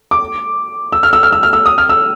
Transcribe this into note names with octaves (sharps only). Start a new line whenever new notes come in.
D6
E6
F6
E6
F6
E6
F6
E6
D#6
F6
E6